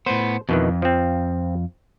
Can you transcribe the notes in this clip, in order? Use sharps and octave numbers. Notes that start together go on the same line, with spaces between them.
A2 B3 C5
F2 B2 D#3 E3
F3 C4